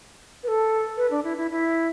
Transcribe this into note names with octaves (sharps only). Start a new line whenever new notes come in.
B4
A4
B4
D4
E4
E4
E4